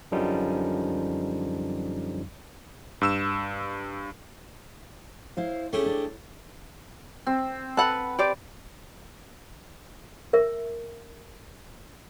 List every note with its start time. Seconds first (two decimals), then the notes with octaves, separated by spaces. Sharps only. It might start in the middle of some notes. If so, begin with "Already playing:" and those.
0.12 F#2 D3 F3 G3 C#4 D#4
3.01 G2 E6 E7
5.37 E4 C5 F5
5.73 A3 C#4 G4 G#4
5.86 D4
7.27 C4
7.77 A4 B4 F#5
8.19 G4 C5 D5
10.33 A#4 E5